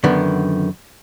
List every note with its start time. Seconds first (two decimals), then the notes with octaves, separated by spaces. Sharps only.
0.04 F#2 D3 D#3 B3